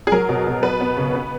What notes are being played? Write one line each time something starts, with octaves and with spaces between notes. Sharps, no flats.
G#4
F#3 A#4
B2
B2
B3 B4
B3
C#3
B3